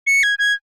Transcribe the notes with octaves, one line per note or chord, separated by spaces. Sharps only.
C#7
G#6
G#6